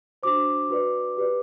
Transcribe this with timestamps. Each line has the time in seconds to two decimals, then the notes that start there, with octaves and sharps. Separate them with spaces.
0.23 D4 F#4 C5 D6
0.70 F#4 B4 D5
1.17 G4 B4 D5